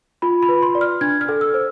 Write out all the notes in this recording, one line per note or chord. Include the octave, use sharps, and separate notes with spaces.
F4 B5
B5
B4
C6
D5
F6
D4 G#6
F6
A4
E6
C5